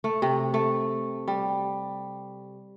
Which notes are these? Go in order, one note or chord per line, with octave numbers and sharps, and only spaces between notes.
A3
C3
A3
G3